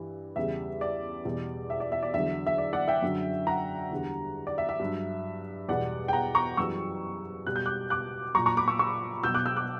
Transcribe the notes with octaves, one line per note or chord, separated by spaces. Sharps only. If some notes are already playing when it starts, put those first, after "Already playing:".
Already playing: G2 E3 G3
E2 C#3 G3 E5
D5
E2 B2 G3
E5
D5
E5
D5
E2 D3 F#3 E5
E5
D5
D5 F#5
E5 G5
F#2 D3 F#3
F#5 A#5
E2 D3 G3
D5
E5
E5
G2 F#3
E2 B2 G3 D5 F#5
G5
F#5 A#5
A#5 C#6
F#2 E3 G3 C#6 E6
B2 G3 F#6
G6
D6 F#6
D6 F#6
A#2 F#3 A#5 C#6
A#5 C#6
B5 D6
C#6 E6
C#6 E6
B2 F#3 E6 G6
D6 F#6
E6 G6
D6 F#6